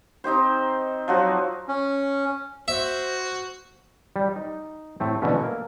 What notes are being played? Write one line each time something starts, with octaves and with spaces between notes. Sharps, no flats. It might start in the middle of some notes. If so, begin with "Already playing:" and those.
C4 D#4 G4 C5
F3 F#3 F#4
C#4
F#4 C5 E5
G3
D#4
A2 A3 C4
B2 D3 E3 A3 C#4
A#3 A#4